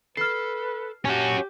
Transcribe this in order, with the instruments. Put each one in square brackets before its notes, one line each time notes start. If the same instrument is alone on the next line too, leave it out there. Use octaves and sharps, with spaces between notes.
[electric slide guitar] A4 [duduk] B4 [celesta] F6 C7
[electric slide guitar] A#2 A5 [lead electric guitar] C#4 F#4 [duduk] G4